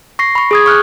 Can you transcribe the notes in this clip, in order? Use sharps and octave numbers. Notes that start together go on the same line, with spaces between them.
C#6 A#6 C7
B5 C#6
G#4 D#6 G#6
C#6 F6 F#6